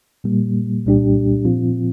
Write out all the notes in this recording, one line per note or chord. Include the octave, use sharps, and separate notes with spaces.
A#2 G3 A#3
C2 A#2 G3 D4 G4
A#2 F3 C4 F4